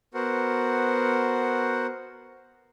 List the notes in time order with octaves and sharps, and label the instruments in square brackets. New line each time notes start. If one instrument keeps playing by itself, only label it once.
[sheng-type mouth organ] B3 F#4 A#4 C5 F#5